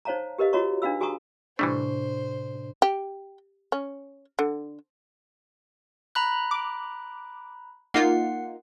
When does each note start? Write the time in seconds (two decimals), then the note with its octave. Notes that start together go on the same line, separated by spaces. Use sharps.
0.05 D#4 C5 C#5 F5 A5 A#5
0.38 G4 A#4 B4 D#5 F5
0.53 F4 F#4 C#5 D#5 A#5 C#6
0.82 D4 D#4 B4 F5 B5 E6
1.00 F#4 G#4 G#5 A#5 C#6 D#6
1.59 A2 C3 E3 G3 A3 D4 C5 C#6
2.82 G4
3.72 C#4
4.39 D3
6.15 A#5 B5 F#6
6.51 D6
7.94 A#3 D#4 F4 F#5 C7